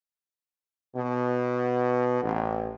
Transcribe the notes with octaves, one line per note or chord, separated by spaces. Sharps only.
B2
A1